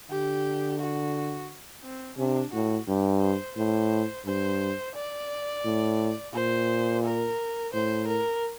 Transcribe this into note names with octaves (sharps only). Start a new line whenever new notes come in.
D3 G4
F#4
C4
C3 D4
A2 F#4
G2 G4
C5
A2 C5
G2 C5
D5
A2
A#2 C5
A#4
A2 C5
A#4